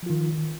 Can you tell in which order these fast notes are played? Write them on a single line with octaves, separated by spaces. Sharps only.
F3 F4 D#3